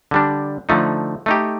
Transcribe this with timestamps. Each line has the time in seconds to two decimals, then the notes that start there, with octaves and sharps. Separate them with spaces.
0.11 D3 G3 D4
0.69 D3 F3 A3 D#4
1.26 A3 D#4 G4